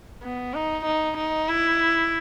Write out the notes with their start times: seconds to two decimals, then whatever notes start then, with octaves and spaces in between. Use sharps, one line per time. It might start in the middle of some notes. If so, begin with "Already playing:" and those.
0.23 B3
0.54 D#4
0.85 D#4
1.18 D#4
1.49 E4